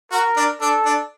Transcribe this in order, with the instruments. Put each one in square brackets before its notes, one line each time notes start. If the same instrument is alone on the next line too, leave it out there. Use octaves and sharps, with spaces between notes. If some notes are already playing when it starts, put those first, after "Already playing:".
[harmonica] F#4 [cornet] A#4
[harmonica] D4
[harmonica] D4 [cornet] A4
[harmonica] D4